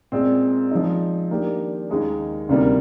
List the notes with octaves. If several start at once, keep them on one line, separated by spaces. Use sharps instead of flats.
A#2 G#3 C4
F3 G#3 D#4
D#3 A#3 D4 G4
D#2 D#3 G#3 D#4 G#4
D2 C3 D#3 G3 A#3